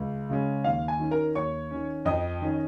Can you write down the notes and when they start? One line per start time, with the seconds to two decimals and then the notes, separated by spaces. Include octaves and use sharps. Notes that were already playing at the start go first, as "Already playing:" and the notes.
Already playing: C#2
0.30 C#3 G#3 C#4
0.64 D#2 F5
0.88 G#5
1.00 D#3 C#4
1.11 A#4 A#5
1.35 D#2 C#5 C#6
1.71 D#3 C#4
2.05 F2 D#5 D#6
2.41 D#3 C#4